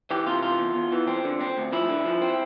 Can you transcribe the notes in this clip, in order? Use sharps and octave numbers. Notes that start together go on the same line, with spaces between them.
E3 G4
C3 F4
E3 F4
E2
E2
E3
C4
D3
C4
D2
F3 E4
D3
F3
C4